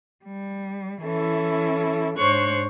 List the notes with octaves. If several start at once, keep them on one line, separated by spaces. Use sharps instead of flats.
G3
E3 C#4 E4 A4
G#2 D4 C5 C#5 C#6 F#6